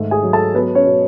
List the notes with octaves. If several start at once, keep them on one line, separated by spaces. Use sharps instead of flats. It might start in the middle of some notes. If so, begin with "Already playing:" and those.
Already playing: G#2 D#3 A3
G#4 G#5
F#3
A4 A5
F#3 B3 B4
C#4 C#5
B2